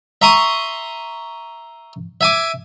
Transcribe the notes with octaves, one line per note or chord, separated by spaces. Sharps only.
E5 A#5 C6 C#6 D#6
E5 G#5 D6